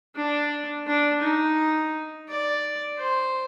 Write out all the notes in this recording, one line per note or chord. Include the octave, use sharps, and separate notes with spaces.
D4
D4
D#4
D5
C5